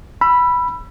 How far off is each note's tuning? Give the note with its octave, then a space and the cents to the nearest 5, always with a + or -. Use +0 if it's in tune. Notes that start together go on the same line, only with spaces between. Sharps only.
B5 -5 E6 +25